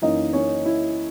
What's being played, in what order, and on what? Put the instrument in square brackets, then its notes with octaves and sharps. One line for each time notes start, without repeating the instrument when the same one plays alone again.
[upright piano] F#2 E3 A#3 C#4 D#4 D#5
C#4 C#5
E4